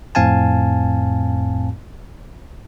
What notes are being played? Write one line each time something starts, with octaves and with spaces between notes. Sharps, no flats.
F2 A2 C4 F5 G#5 A5